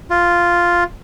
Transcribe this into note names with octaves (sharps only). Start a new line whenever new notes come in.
F4